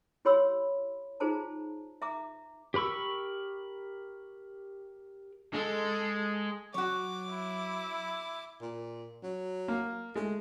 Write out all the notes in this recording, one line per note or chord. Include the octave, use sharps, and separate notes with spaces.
E4 G4 C#5 B5 C6 E6
D#4 F4 G#4 C5 A5 A#5
E5 A#5 D6
G4 A#4 B5 C#6 E6
G#3 A4
F#3 F#4 C#5 D6
E4
A#2
F#3
A#3
G#3 A3